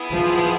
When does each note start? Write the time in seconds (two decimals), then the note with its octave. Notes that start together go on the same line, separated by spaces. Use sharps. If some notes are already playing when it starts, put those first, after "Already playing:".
Already playing: B3 E4 G#4
0.11 F3